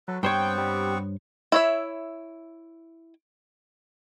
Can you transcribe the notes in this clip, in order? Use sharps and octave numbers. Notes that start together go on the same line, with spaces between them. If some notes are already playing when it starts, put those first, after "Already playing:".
F#3 A4 B4
G2 B3 C4 C5 C#5 G5 C#6
G3
E4 C#5 E5